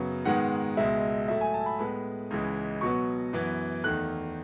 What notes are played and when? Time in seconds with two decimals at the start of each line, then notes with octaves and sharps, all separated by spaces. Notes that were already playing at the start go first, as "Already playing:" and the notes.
Already playing: F#2 C#3 F#3 B3
0.25 G#2 D#3 G#3 B3 F#5
0.77 C#2 B2 G#3 E5
1.28 A2 F#3 A3 E5
1.41 G#5
1.54 A5
1.66 B5
1.79 A2 G#3 B3 B5
2.31 C#2 C#3 E3 G#3
2.81 B2 F#3 B3 C#6
3.33 F#2 E3 B3
3.84 E2 D#3 A3 F#6